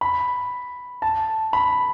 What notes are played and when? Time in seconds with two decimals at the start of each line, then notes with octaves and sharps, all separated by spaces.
0.01 B5
1.02 A5
1.53 B5